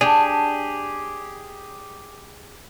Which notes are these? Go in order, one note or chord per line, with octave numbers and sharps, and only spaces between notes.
D4 G4 G#4